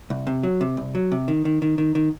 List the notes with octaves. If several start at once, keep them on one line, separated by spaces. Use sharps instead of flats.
C2
C3
F#3
C3
C2
F#3
C3
D#3
D#3
D#3
D#3
D#3